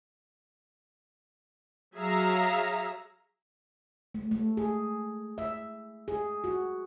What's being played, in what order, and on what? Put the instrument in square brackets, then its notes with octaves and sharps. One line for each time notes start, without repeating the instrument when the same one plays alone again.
[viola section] F#3 G#4 E5 F5 A#5
[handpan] A3
A3
G#4
E5
G#4
F#4